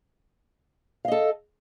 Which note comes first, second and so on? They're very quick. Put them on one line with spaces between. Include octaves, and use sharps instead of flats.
F5 D#5 A4